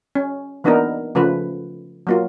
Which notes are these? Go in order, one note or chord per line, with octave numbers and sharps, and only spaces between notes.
C#4
E3 A#3 B3 D4 D#4 A#4
C#3 F3 A3 B4
F#3 A#3 F4